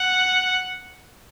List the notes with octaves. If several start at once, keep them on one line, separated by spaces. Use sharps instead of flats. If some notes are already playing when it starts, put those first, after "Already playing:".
Already playing: F#5